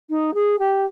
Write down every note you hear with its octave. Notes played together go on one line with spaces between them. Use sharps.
D#4
G#4
G4